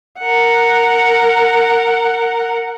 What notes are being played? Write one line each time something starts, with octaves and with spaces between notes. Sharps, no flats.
A#4 F#5